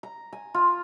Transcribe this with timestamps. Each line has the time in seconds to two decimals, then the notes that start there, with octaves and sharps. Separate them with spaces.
0.03 A#5
0.33 G#5
0.54 F4